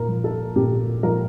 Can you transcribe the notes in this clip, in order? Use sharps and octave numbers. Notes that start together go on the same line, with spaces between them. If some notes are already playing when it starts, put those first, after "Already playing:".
Already playing: A#2 A#4
F3
A4
A#2 G4
F3 A#4